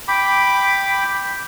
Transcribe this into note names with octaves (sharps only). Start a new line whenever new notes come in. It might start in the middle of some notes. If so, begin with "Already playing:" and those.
G5 B5 D6